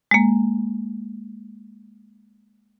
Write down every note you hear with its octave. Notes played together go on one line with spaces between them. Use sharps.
G#3 A#3